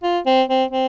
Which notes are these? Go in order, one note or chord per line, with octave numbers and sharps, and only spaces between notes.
F4
C4
C4
C4